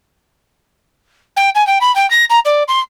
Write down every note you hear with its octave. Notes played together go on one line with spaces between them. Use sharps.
G5
G#5
G5
B5
G5
A#6
A#5
D5
C6